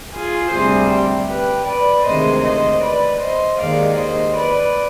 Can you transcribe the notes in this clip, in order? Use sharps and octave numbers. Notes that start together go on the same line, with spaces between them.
F4 G#4
D2 C3 G3 G#4 C5
G4
G4 B4
B4 D5
D2 C3 D#3 G#3 C5 D#5
C5 D#5
B4 D5
C5 D#5
D#2 D#3 G#3 D5 F5
C5 D#5
B4 D5